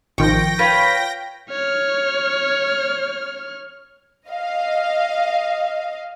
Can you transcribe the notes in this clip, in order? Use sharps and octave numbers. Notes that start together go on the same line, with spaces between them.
A1 D#3 F3 G5 C#6 A#6
F4 B4 C#5 B5
C#5 F6
D#5 F5